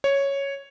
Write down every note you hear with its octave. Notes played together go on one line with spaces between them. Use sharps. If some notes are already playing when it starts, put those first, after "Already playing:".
C#5